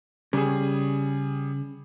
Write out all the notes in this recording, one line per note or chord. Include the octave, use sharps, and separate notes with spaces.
C#3 G3 G#4